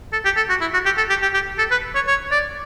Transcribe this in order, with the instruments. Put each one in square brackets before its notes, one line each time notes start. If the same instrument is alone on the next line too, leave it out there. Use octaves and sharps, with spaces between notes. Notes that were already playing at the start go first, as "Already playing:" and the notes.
[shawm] A4
G4
A4
F#4
E4
F#4
G4
A4
G4
G4
G4
A4
B4
C#5
C#5
D5